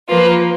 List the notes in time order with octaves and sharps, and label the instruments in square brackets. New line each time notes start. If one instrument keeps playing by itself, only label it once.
[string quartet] F3 A#3 F4 [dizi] B4